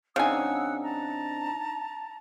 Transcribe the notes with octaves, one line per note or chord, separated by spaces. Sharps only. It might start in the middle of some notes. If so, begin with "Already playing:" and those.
C#3 C4 D4 D#4 F#5 G#5 D#6 E6
A5 A#5